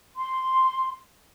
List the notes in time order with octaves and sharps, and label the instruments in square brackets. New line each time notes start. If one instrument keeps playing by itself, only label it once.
[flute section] C6